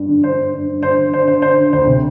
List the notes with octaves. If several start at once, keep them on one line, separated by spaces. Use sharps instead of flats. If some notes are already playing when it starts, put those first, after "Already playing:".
Already playing: G2
D3
D3 C5
G2
G2
G2
D3 C5
D3
D3 C5
D3 C5
D3 C5
D3
D2 C5
C3